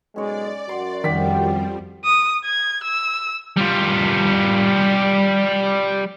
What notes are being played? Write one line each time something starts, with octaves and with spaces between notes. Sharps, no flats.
B1 G#3 C#4 C#5 D5
F#2 F#4 C6
F2 D#3 F3 G3 D5 G5 B6
D#6
G#6
E6
G3 F4